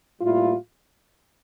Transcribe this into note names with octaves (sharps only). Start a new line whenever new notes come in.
A2 G3 A#3 E4 F4